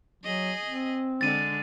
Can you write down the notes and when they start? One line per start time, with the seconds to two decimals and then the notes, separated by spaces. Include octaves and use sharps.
0.23 F#3 G#4 D#5
0.67 C4
1.21 D3 G#3 A6 D#7